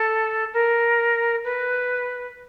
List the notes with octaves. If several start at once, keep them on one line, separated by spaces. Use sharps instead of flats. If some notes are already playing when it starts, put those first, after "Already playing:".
Already playing: A4
A#4
B4